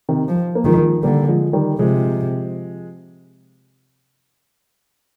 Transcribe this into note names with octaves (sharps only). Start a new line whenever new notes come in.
C3 D#3
F3
A#3
D#3 F3 G#3
D3 G3 A#3
F3 G#3
D#3 G3
C3 F3 G#3